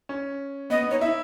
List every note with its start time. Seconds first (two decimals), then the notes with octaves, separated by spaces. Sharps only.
0.09 C#4
0.70 B3 D#5
0.81 B3
0.91 D#4 C#5
1.01 E4 E5